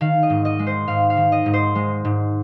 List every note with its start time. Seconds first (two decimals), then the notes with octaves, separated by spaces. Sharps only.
0.01 D#3 F5
0.23 D#5
0.30 G#2
0.45 D#5
0.59 G#3
0.67 C5
0.88 G#2 F5
1.10 F5
1.17 D#3
1.32 D#5
1.46 G#2
1.54 C5
1.75 G#3
2.05 G#2